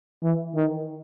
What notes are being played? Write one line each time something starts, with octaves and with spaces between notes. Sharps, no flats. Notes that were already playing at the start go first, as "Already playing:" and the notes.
E3
D#3